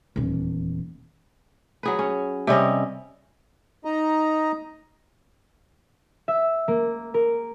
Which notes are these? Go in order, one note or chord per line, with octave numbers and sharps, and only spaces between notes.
D#1 E2
F#3 G#4 B4
C#4
C3 G3 C#4 D#5
D#4 D#5 A#5
E5
A#3
A#4